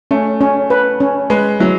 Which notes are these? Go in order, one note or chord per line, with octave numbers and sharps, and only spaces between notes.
A3 C#4
C#4
B4
C#4
G#3 B4
F#3 E4